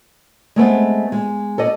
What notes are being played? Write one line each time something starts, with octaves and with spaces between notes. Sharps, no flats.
G#3 A3 B3 C4
G#3
A4 D5 D#5